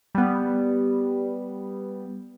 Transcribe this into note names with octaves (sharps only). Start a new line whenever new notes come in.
G3 B3